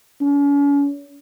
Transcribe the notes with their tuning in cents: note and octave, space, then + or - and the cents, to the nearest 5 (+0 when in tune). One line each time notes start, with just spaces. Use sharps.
C#4 +40